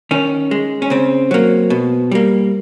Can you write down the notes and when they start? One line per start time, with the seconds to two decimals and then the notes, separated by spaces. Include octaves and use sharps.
0.11 D#3 C#4
0.51 G#3
0.82 C#4
0.90 C#3 C4
1.31 F#3 A#3
1.70 B2
2.11 G3 A#3